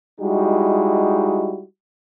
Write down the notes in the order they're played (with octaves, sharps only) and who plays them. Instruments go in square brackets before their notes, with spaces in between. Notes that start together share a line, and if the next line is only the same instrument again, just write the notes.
[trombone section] G3 G#3 D#4 E4 F#4